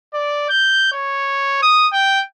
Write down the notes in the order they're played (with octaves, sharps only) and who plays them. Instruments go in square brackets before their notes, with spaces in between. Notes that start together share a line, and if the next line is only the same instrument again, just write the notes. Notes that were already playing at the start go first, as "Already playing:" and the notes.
[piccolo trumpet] D5
G6
C#5
D#6
G5